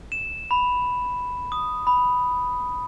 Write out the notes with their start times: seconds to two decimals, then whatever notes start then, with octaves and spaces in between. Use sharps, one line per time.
0.12 E7
0.51 B5
1.52 D#6
1.87 B5